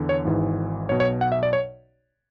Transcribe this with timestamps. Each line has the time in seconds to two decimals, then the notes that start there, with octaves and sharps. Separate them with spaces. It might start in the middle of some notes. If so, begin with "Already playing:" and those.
Already playing: E2 D3
0.09 C#5
0.25 G#1 G#2 E3
0.89 B1 B2 C#5
1.00 C#5
1.21 F#5
1.32 E5
1.43 D5
1.53 C#5